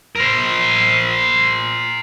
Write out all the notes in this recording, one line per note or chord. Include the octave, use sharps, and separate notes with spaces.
A#4 C5